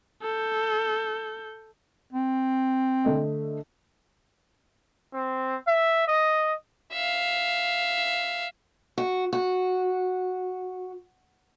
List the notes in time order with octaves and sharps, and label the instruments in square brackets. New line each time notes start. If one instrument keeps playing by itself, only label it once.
[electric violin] A4 G6
[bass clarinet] C4
[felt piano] D3 A3 D#5
[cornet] C4
E5
D#5
[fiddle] E5 F5
[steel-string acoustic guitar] F#4
F#4